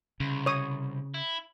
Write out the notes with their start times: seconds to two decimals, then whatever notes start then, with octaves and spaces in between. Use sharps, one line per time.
0.20 C2 C#3
0.46 C#5 D#6
1.14 E4